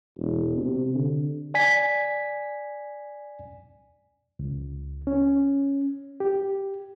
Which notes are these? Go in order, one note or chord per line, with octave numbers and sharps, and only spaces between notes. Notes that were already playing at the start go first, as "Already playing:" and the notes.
E1
C3
D3
D5 G#5 B6
C#2
C#4
G4